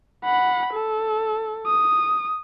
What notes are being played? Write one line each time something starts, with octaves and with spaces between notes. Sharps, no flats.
F#5 B5
A4
D#6